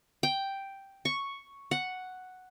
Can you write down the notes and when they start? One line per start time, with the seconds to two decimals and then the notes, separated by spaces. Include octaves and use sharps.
0.23 G5
1.05 C#6
1.71 F#5